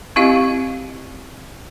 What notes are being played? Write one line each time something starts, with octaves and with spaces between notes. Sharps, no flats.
C4 E4 G4 D#5 F5